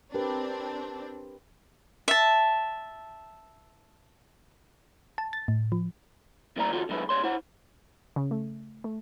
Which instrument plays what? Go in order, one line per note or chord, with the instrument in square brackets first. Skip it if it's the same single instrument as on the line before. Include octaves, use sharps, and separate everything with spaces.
[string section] C4 D4 [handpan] G4 A#4 B4
[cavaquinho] E5 A5
[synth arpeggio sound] A5
A6
A2
F3
[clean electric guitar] C3 G3 A#3 E4 D5 A#5
D#3 F4 F#4 A4
D3 F#3 G#3 E4 A4 B4
G#2 G#3 C#5 C6
E4 C5 F#5
[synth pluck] C#3
A3
A3